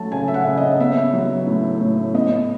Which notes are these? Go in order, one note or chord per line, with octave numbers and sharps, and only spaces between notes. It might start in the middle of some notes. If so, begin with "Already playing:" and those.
Already playing: F#3 A3 A5
C#3 G#5
E5
F#5
C#3
D#5
B3 E5
F#3
A2
A2
B3 D#5